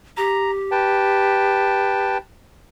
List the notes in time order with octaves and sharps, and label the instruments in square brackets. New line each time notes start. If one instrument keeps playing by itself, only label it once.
[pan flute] G4 [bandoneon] A#5
[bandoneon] B4 G5 A5